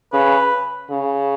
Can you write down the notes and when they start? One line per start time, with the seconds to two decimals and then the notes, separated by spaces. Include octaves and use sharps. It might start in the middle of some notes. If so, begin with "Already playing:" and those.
0.13 C#3 B4
0.90 C#3